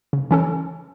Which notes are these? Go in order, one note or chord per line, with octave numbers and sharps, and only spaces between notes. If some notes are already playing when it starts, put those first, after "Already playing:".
C#3
E3 C#4 A4